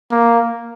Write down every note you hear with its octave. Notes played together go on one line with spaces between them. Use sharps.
A#3